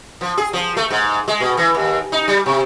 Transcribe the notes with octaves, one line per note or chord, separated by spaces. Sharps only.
F3
G#4
F3
A3
G#2
G#3
B2
E3
D#2
D#4
G3
C3